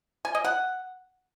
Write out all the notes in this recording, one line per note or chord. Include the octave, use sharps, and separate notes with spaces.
G#5
D#5
F#5